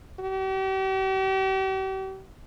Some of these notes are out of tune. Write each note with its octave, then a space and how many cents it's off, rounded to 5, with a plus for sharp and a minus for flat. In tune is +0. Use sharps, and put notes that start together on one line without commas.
G4 -40